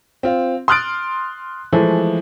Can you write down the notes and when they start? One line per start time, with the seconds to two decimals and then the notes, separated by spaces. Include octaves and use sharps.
0.23 C4 F4
0.68 C6 D#6 F6 F#6 A6 D7
1.72 E3 F3 G#3 A3